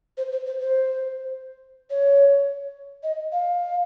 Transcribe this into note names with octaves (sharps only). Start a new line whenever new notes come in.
C5
C5
C5
C5
C#5
D#5
F5